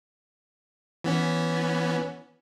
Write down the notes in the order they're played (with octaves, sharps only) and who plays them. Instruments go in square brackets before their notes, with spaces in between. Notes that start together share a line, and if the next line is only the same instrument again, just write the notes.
[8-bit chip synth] E3 B3 C#4